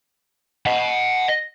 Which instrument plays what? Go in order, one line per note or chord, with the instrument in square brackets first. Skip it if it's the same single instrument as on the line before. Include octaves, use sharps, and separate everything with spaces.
[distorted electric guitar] D#5 F#5